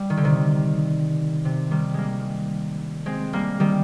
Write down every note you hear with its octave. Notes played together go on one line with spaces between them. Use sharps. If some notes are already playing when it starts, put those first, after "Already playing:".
Already playing: G3
D#3
D3
C3 D#3
C3
D#3 G3
G3 G#3 A#3
G#3 C4
G3 A#3
D#3 G3